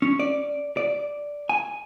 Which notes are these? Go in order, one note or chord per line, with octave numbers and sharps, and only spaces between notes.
C#4
D5
D5
G#5